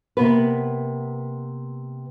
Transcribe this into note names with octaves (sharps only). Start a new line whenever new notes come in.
C3 A#3 B3 B4